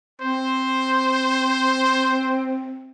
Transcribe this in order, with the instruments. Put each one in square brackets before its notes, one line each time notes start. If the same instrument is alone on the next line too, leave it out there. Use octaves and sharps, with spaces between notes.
[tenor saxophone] C4 [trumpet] C5